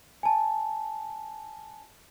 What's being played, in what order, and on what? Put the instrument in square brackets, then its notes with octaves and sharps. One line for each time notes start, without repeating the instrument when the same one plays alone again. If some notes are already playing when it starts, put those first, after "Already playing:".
[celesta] G#5 A5